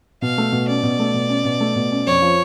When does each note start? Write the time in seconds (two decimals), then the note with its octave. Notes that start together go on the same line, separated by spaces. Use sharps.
0.22 B2 F5
0.38 A3
0.52 B2
0.68 C#4 D5
0.83 B2
0.99 A3
1.14 B2
1.29 C#4
1.45 B2
1.60 A3
1.76 B2
1.91 C#4
2.07 F2 C#5
2.22 F3